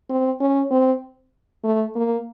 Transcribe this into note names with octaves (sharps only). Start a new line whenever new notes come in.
C4
C#4
C4
A3
A#3